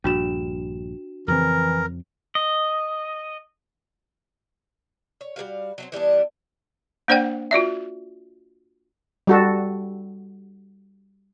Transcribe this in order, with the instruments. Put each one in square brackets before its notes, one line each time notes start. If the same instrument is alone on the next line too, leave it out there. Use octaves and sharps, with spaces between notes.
[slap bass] A#1 G2 [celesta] D4 F#4 E7
[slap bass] F2 C#3 C4 [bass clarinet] E3 [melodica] A#4
[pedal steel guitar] D#5
[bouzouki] C#5
G3 A#3 F#4 F5
F#3 A3 C4
E3 G3 B3 D4
[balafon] A#3 D4 C5 D5 F#5 G5
F4 F#4 D5 E5
[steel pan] G3 F#4 A4